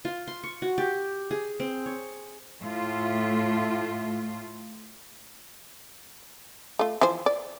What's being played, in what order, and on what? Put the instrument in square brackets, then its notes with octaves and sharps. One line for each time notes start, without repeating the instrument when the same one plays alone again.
[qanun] F4
C6
C#6
F#4
G4
G#4
C4
C#5
[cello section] A2 A3 F4
[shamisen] A3 F4
E3 F3 C5
D5